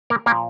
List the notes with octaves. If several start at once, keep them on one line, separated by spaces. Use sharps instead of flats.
A#3 A#4
A#2 F3 A#3 A#4